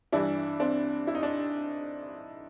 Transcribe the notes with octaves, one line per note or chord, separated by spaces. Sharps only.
G2 E3 G3 D4 E4
C4 D4
E4
D#4
D4